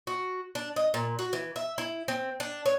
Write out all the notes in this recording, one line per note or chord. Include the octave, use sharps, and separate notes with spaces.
F#4
D4
D#5
A#2
F#4
E3
E5
E4
C4
D4
C#5